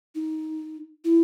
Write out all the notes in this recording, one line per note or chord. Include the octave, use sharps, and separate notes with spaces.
D#4
E4